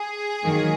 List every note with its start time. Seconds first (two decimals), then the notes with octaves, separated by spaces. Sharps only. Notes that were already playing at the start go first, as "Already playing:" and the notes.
Already playing: G#4
0.43 G#2 D#3 F#3 A#3